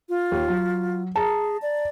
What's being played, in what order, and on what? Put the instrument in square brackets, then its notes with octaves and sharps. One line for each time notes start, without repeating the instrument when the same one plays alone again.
[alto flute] F4
[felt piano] D#2
F#3
[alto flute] G#4 [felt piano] A5 A#5
[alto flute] D5